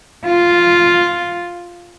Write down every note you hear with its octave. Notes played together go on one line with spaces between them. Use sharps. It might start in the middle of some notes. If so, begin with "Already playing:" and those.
F4